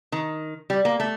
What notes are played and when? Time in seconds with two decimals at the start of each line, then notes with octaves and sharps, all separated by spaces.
0.12 D#3
0.70 G3
0.85 A#3
1.00 A3